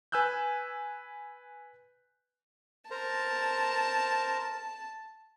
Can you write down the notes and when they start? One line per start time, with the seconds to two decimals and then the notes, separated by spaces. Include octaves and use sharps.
0.12 B4 G#5 E6 F#6 G6
2.91 A#4 C5 A5 A#5